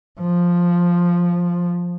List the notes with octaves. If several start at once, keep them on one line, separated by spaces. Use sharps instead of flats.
F3